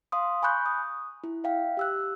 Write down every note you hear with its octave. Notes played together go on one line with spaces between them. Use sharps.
F5 C6 D#6
G#5 B5 C#6 F#6 G6
D#6
E4
E5 F5 G5
G4 E6 F#6